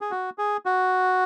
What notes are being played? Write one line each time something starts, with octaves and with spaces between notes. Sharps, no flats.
G#4
F#4
G#4
F#4